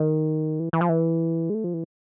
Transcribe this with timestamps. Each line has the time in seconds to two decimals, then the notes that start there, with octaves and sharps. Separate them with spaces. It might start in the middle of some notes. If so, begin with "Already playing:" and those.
Already playing: D#3
0.60 E3
0.73 E3
0.81 F3
0.89 E3
1.50 G#3
1.54 A3
1.64 F3
1.74 E3